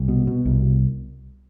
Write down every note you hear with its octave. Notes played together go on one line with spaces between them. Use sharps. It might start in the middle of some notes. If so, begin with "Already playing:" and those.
Already playing: C2
B2
B2
C2